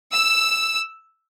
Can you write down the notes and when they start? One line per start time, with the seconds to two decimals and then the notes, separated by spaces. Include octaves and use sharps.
0.13 E6